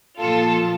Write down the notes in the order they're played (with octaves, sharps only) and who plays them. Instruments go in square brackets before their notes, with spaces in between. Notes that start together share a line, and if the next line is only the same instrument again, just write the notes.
[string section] A#2 F3 F4 A4